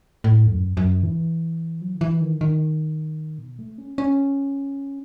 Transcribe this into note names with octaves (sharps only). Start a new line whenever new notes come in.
A2
E2
F#2
F#2
E3
F#3
D#3
E3
D#3
D#3
B2
A3
C#4
C#4